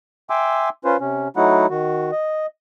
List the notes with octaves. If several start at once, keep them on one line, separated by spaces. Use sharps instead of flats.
E5 G5 G#5 C6 D6 E6
C#4 F4 B4 C5
C3 C#4
F#3 A3 D#4 E4 F#4 F#5
D#3 F#4
D#5